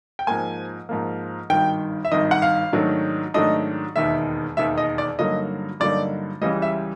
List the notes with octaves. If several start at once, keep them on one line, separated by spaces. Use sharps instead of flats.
G5
G#2 F3 A#3 G#5
G#2 F3 A#3
G#1 G2 D#3 G5
E5
G#1 G2 D#3 D#5
F#5
F5
G#2 D#3 F#3 A3 D4
G#2 D#3 F#3 A3 D4 D#5
E1 D#2 D#3 E5
E1 D#2 D#3 E5
D#5
D5
G2 D3 F#3 A#3 D#4 D#5
G2 D3 F#3 A#3 D#4 D5
C#2 C#3 E3 G3 D#5
E5